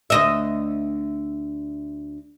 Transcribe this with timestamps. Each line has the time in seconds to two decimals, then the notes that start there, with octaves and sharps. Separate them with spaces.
0.10 D2 D#5 E5